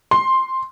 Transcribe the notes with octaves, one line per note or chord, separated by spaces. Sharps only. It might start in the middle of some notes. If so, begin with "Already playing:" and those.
C6